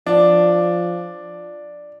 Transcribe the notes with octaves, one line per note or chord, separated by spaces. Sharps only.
F3 D4